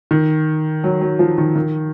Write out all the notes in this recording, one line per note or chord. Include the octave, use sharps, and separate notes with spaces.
D#3
F#3
F#3
F3
D#3
D#3